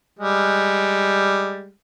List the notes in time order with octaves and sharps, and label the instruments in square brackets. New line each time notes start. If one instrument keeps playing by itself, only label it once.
[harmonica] G3 G#3